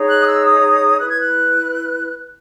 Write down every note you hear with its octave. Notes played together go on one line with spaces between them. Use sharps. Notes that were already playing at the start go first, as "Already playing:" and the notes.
Already playing: D#4 G#4 C#5
F#6
D#6
E6
D#6
E4 B4 F#6
G#6
F#6